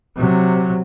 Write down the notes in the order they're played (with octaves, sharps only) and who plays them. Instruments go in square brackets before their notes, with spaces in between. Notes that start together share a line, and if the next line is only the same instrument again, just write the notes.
[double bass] C3 F#3